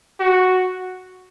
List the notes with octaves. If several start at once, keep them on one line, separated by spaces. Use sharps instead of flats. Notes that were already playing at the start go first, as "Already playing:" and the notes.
F#4